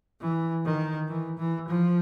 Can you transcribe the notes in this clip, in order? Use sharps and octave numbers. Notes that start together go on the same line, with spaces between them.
E3
D#3
E3
E3
F3